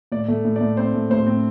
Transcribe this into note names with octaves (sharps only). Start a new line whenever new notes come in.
A2 D5
A3
A2
D5
A2
C4 C5
A2
A2 C5
C4